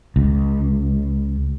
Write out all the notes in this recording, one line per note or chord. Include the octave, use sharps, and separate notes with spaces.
C#2